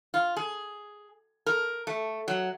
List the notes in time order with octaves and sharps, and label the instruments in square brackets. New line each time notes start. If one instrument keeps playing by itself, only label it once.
[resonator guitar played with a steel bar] F4
G#4
A#4
A3
F#3